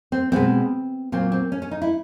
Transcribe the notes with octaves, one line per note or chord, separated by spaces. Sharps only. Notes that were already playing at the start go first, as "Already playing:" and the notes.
C4
B2 G#3 B3 C4
A#2 F#3 A#3 C4
C4
C#4
C#4
D#4
E4